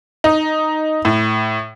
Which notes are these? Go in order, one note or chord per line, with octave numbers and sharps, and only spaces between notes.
D#4
A2